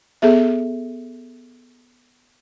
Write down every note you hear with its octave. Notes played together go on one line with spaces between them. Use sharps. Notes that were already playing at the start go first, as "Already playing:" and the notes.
B3 G#4 A4 E5